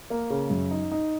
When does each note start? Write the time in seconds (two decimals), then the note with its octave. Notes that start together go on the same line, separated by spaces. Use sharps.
0.10 A#3
0.30 C#3
0.50 F#2
0.71 D#4
0.92 D#4